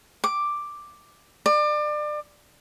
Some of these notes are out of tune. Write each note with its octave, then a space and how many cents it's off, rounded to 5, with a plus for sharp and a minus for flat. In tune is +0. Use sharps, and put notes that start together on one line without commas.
D6 +5
D5 +30